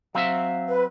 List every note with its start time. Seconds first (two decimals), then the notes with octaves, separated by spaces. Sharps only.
0.15 F#3 C4 E5 F5
0.68 B4